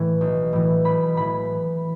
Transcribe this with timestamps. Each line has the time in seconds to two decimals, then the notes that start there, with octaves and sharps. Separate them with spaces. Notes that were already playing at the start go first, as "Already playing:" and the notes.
Already playing: A2 E3
0.21 B1
0.53 A2 E3
0.84 B1 B5
1.16 A2 E3 B5